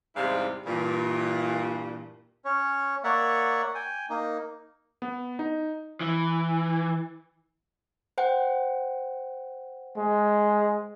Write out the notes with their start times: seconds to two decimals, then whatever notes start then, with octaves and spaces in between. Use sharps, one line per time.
0.16 E2 G#2 C3 G3 E4 F5
0.66 G2 A#2 E3
2.45 C#4 C#5
3.04 A#3 C#5 D5 E5 F#5
3.75 G5 G#5
4.10 A#3 D#4
5.02 B3
5.39 D#4
6.01 E3
8.18 C5 F#5 G5
9.97 G#3